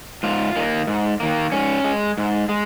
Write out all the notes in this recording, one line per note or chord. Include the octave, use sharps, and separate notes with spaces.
G#2 F4
D#3 A#3
G#2
D#3 A#3
G#2 C#4
G#3
G#2
G#3